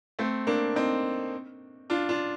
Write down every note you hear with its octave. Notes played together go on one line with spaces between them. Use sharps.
A3 C4
A#3 D4
C4 D#4
D4 F4
D4 F4